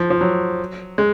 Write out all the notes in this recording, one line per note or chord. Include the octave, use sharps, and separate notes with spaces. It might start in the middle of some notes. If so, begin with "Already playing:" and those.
Already playing: F3
F3
F#3
G#3